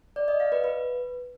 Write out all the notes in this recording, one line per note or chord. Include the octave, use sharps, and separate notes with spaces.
D5
D#5
F5
B4
B4